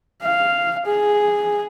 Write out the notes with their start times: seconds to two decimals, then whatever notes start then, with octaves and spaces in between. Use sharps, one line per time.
0.22 F5
0.86 G#4